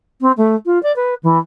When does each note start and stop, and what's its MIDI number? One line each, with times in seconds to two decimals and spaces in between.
0.21 0.32 60
0.37 0.55 57
0.66 0.81 65
0.83 0.94 74
0.96 1.14 71
1.23 1.38 52